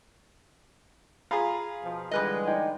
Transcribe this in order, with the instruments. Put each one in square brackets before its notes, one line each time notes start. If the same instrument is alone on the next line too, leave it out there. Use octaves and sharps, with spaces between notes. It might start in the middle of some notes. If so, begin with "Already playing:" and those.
[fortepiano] F4 G#4 [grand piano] A#5 B5
[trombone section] B2 F3
[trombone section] D3 E3 G#3 [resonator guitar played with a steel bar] G3 B4 D#5
[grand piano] D#4 D5 G5